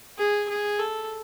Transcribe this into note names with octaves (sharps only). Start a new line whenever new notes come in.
G#4
G#4
A4